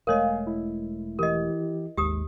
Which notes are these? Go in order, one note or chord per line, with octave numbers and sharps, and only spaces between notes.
E1 G#3 A3 A#4 C#5 D#5 F5 G#5
E4
E3 G4 A#4 D#5
G#1 D#2 G#3 G4 D#6